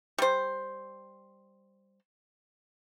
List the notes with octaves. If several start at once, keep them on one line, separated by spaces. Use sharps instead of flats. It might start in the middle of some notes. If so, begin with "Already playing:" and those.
G3 C5